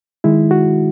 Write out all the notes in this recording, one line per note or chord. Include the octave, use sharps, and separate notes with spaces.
D#3 G#3 E4
F#4